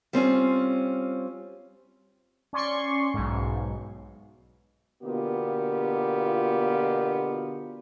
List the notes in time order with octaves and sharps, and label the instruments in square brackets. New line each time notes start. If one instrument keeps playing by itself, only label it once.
[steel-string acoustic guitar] G3 C4 C#4 F4
[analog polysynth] C#4 D5 C6 C#6
B1 G#2
[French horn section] B2 D3 A#3 B3 F4 G4